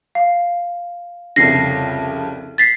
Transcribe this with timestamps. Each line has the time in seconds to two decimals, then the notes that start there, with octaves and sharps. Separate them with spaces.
0.15 F5
1.36 C2 F2 C#3 A#6 C7
2.58 A6 B6 C7